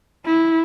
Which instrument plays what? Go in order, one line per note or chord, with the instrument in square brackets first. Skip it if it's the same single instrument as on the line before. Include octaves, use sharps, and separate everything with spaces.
[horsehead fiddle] E4